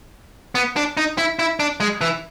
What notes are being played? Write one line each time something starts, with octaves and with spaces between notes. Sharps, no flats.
B3
D4
D#4
E4
E4
D4
G#3
E3